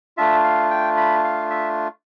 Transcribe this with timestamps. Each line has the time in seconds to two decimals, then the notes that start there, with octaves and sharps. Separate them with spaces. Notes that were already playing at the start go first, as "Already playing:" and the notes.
0.17 A3 D4 F4 E5
0.44 F5
0.71 G5
0.97 B5
1.24 F5
1.50 E5